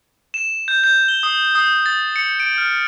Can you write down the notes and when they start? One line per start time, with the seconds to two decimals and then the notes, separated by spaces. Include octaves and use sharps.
0.34 E7
0.68 G6
0.84 G6
1.08 G7
1.23 D#6
1.55 D#6
1.86 A6
2.16 C#7
2.40 D7
2.58 F6